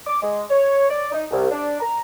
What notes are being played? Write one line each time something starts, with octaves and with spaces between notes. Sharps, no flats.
D6
G#3
C#5
D5
D#4
C2
D4
A#5